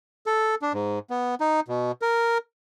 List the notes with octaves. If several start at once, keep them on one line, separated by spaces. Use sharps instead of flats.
A4
D4
G#2
B3
D#4
B2
A#4